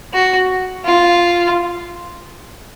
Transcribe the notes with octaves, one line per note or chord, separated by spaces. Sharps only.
F#4
F4